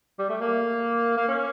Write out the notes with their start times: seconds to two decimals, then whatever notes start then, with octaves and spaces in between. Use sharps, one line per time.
0.19 G3
0.29 A3
0.41 A#3
1.17 A#3
1.28 C#4